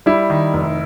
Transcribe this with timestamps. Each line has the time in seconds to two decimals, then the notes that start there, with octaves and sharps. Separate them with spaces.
0.06 G3 E4
0.30 D#3
0.54 F1